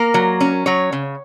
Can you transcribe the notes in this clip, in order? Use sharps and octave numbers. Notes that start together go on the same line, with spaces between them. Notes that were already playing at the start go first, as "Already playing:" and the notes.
Already playing: A#3 A#4
F#3
C#4
F#3 C#5
C#3